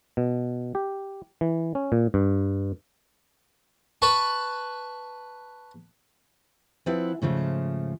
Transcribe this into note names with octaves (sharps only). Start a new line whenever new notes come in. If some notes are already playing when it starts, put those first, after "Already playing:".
B2
G4
E3
C#4
A#2
G2
B4 A5 B5 C#6
F3 C4 E4 B4 F#5
G#2 C#3 F3 A3